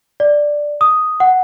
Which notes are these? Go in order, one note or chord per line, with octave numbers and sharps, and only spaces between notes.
D5
D#6
F#5